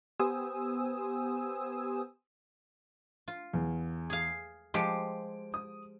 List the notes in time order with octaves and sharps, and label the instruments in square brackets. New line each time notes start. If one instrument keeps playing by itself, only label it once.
[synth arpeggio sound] B3 G4 C5 G#5 D#6 E6
[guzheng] F4
[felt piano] E2
[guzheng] G#4 F5
[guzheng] F3 G#3 G4 [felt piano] D6 D7
[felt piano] D#6